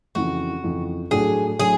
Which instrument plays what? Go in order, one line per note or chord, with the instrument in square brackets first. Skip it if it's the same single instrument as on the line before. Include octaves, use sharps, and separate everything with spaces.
[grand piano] F2 C#3 E3 [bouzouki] F#4
[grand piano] F2 C#3 E3
[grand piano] A2 F#3 A3 D4 F#4 [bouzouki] G#4
[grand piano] A2 F#3 A3 D4 [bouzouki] G#4